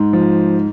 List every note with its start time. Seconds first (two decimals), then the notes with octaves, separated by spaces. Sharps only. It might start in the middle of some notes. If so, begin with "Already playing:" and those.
Already playing: G#2
0.13 F3